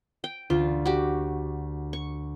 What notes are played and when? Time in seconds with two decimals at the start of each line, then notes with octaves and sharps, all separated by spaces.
0.24 G5
0.50 D2 F4
0.86 F#4 G4
1.93 C#6